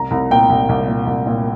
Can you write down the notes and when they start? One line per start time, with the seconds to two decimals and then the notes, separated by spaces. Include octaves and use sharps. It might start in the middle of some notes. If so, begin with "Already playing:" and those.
Already playing: C2 A#5
0.11 C2
0.31 A#2 G5
0.50 C2
0.69 C2
0.88 A#2
1.07 C2
1.26 A#2